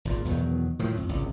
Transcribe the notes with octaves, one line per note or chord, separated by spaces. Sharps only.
G#1 A#2
E2 B2 D#3 F#3
A2 D#3 F3 F#3
F2
G#1 C#2 C3